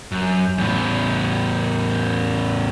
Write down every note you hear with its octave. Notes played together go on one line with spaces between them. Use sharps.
F#2
E2 A2